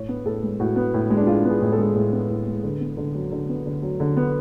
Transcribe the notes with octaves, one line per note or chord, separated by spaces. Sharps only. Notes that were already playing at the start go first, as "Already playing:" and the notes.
Already playing: A2 C#5
B3
A2 A4
G#3
A2 F#4
B3
A2
G#3
D4
A2 F4
B3 G#4
A2
A4
G#3
A2
B3
A2
G#3
D3 B4
B3
D3
F#3
D3
B3
D3
F#3
D3
B3